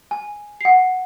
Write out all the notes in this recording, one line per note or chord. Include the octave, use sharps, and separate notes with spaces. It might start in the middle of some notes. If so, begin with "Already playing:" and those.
G#5
F#5 C7